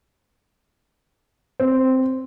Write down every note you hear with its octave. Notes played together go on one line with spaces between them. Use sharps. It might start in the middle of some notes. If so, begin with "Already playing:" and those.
C4